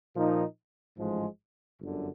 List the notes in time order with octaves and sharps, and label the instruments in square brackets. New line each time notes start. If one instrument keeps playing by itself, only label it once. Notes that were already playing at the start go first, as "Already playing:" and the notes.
[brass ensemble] A#2 F3 A#3 D#4
A1 G#2 F3 G#3
G1 F#2 D3